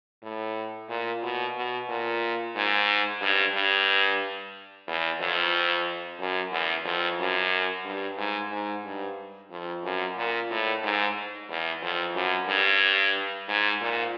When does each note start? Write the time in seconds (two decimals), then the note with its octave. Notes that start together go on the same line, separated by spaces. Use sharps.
0.23 A2
0.89 A#2
1.23 B2
1.55 B2
1.89 A#2
2.55 G#2
3.22 G2
3.55 G2
4.87 E2
5.20 F2
6.20 F#2
6.52 E2
6.85 F2
7.19 F#2
7.84 G2
8.18 G#2
8.51 G#2
8.85 G2
9.51 F2
9.84 F#2
10.17 A#2
10.50 A2
10.83 G#2
11.49 E2
11.82 F2
12.15 F#2
12.48 G2
13.48 G#2
13.81 A#2